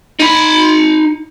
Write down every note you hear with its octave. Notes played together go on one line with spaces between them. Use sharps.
D#4 B5